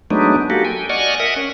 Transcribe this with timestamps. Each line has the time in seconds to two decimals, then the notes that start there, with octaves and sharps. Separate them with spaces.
0.11 F#3 G#3 A3 B3 D4 D#4
0.50 A#3 F#4 G4 A4
0.65 G5 G#5
0.89 D5 D#5 F#5 G#5 C#6 F6
1.20 A#4 E5 F#5 D#6
1.36 C#4